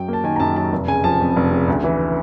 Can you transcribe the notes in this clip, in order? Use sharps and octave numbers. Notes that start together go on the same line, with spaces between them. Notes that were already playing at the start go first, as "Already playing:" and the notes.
Already playing: F#2 F#3 G5
A#3 A5
D#3 G#5
A#5
F#2 A5
F#3 A5
F1
C#3 G#5
F3 A5
F2
F1
C#3
D2
E3